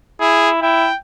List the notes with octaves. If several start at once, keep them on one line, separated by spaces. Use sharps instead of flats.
E4 G#4
E4 G5